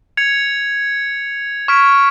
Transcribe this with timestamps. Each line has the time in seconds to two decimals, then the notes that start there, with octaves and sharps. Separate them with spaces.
0.17 G#6 C#7 F7
1.68 C#6 F6 G#6 B6 D7